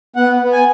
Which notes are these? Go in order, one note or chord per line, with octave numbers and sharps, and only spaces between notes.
B3 F#5
B3
G#5